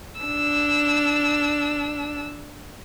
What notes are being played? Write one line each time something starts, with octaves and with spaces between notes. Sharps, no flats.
D4 E6